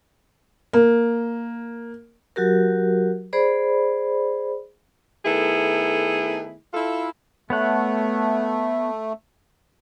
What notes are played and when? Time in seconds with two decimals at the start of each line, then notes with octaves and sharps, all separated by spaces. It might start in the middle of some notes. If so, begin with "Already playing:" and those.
0.73 A#3
2.36 F#3 F#4 G4 A#4
3.33 G#4 C5 D5 B5
5.25 D#3 A3 B3 E4 G#4 A4
6.73 E4 F4 A4
7.50 A3 B3 C#5 F#5